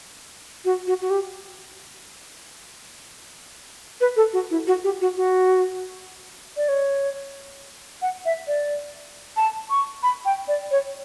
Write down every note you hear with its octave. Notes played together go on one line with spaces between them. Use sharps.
F#4
F#4
F#4
G4
B4
A4
F#4
E4
F#4
G4
F#4
F#4
D5
C#5
F#5
E5
D5
A5
C#6
B5
G5
D5
C#5